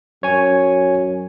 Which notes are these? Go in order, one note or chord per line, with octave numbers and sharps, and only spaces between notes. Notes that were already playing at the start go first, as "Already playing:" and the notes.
F#2 C#5 G#5